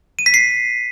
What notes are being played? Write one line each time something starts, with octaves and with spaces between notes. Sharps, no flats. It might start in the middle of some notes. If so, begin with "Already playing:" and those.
D#7
B6
C7